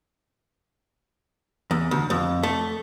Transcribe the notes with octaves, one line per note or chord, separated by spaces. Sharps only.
E2
D2
F2
A3